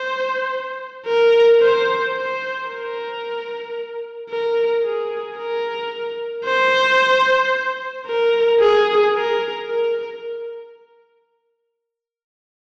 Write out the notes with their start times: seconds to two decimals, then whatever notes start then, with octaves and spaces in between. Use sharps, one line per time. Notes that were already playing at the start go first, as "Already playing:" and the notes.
Already playing: C5
1.06 A#4
1.61 C5
2.15 C5
2.68 A#4
4.30 A#4
4.83 G#4
5.37 A#4
6.45 C5
8.07 A#4
8.60 G#4
9.14 A#4
9.68 A#4